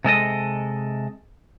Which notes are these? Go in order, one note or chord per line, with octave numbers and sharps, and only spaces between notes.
C3 G#3 A4 D#5